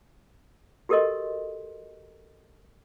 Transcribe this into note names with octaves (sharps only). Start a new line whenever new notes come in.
F#4 G4 A4 A#4 D#5 C6